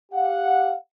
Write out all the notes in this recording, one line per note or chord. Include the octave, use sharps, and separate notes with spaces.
G4 F5 F#5